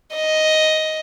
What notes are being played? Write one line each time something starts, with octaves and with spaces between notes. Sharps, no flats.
D#5